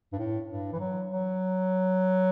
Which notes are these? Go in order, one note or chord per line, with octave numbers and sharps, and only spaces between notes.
G2
A2
G2
E3
F#3
F#3